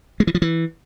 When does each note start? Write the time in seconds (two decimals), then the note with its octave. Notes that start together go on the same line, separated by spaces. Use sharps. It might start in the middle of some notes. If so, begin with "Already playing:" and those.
0.20 G#3
0.27 E3
0.35 F3
0.42 E3